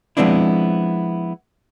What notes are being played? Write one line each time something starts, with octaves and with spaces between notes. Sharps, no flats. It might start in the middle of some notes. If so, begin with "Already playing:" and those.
F3 G#3 B3 C4 D4 E4